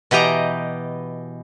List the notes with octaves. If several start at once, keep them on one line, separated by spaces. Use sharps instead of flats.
B2 E3 G4 D#5 A#5